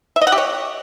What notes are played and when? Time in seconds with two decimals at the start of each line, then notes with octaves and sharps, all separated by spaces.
0.16 E5
0.21 D#5
0.27 F#5
0.32 G4
0.38 C#5